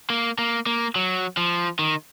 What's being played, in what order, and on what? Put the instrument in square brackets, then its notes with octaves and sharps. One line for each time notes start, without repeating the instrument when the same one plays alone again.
[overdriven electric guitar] A#3
A#3
A#3
F#3
F3
D#3